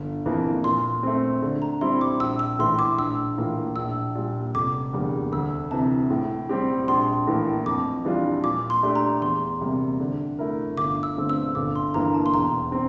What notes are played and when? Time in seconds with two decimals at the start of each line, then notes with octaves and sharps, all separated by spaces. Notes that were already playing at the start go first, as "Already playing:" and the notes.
Already playing: G1
0.26 F2 E3 A#3
0.64 A#2 C6
1.03 A3 C4
1.42 D3
1.62 A#5
1.81 G3 C4 E4 C6
2.01 D6
2.20 A#1 E6
2.39 E6
2.59 A2 E3 C6
2.79 D6
2.98 A#1 E6
3.37 A2 E3 A#3 F4
3.76 A#1 E6
4.15 A#2 G3
4.55 F1 D6
4.93 E2 D3 G3 A#3
5.32 D2 E6
5.71 C3 E3 A5
6.10 A2
6.49 G3 C4 G4
6.88 A#1 C6
7.27 A2 E3 A#3
7.66 F2 D6
8.05 E3 G3 D4 F4
8.44 A#2 D6
8.70 C6
8.83 A3 D4 G4
8.95 A#5
9.22 E2 C6
9.61 C3 G3 A#3
10.00 D3
10.39 A3 E4 A#4
10.77 G1 D6
11.03 E6
11.17 G2 D3 A3 C4
11.29 E6
11.55 G1 D6
11.76 C6
11.94 G2 E3 A#3 A#5
12.14 A5
12.26 C6
12.33 E1 A#5
12.72 C4